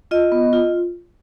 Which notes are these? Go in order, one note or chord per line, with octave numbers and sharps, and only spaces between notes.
F4 D#5
B3
F4